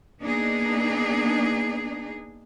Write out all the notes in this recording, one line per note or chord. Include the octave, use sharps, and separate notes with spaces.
A#3 B3 D4 D#4 G#4